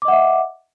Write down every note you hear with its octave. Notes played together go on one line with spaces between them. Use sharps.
D#5 E5 F#5 D6